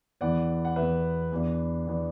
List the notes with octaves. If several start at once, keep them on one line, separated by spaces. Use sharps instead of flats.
E2 E3 B3 D5 F#5
F#5
E2 E3 B3 B4 E5
E2 E3 B3 D4
E3 B3 D4